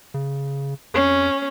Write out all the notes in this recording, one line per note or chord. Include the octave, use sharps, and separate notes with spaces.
C#3
F2 C#4